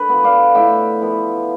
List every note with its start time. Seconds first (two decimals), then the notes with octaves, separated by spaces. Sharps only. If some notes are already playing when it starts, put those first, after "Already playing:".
Already playing: D3 B4
0.09 F3 B3
0.24 D5 F5
0.55 A2 E5 G5
1.01 F3 B3